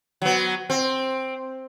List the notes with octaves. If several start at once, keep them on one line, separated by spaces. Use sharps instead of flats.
F#3 B3
C4